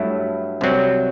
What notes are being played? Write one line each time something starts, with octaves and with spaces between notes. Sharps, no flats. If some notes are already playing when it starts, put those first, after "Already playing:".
Already playing: G2 F#3 A3 E4
C2 C3 F#3 C4